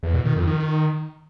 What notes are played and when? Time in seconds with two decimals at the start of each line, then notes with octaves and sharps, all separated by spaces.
0.03 E2
0.14 B2
0.25 D#3
0.36 F2
0.47 D#3